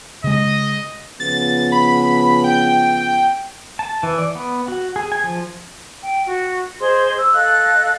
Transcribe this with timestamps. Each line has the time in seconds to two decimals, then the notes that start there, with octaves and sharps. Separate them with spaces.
0.24 C#3 G#3 D#5
1.20 C#3 F3 B3 A6
1.72 B5
2.44 G5
3.79 A5
4.03 E3
4.18 D5
4.35 B3
4.68 F#4
4.96 G#4
5.12 G#5
5.24 F3
6.02 G5
6.26 F#4
6.79 G#4 C5 D#5 C6
7.17 E6
7.34 A4 D#5 F5 F#6